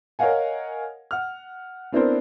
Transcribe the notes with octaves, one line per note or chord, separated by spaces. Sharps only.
A#4 C#5 D#5 F5 F#5 G#5
F#5 F6
B3 C4 D4 E4 A#4 C5